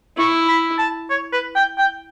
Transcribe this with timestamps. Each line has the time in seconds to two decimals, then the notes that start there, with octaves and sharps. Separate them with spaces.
0.17 E4 C#6
0.48 B5
0.78 A5
1.10 C#5
1.32 B4
1.56 G5
1.78 G5